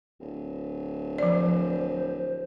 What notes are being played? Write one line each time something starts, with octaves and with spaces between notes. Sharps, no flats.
D1
F3 C5 D5